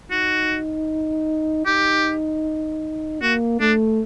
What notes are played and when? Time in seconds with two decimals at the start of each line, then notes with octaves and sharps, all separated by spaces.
0.11 D#4 F#4
1.66 D#4 G4
3.21 A#3 F#4
3.60 A3 D4